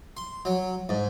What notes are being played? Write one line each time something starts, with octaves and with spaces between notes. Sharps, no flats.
C6
F#3
G#2